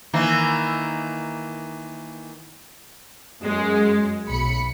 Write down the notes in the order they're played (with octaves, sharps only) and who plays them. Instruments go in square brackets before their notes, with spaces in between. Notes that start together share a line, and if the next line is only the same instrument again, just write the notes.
[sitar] D#3 E3 A#3
[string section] F#2 G#3
B1 B5 C#7